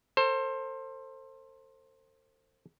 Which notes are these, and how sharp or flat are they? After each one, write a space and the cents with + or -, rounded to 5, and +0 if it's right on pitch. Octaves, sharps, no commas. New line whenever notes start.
A4 +40 C5 +20